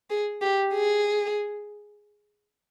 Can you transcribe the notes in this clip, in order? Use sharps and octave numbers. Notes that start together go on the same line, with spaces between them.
G#4
G4
G#4